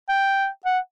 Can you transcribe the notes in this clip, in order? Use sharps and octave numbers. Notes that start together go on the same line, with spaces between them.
G5
F#5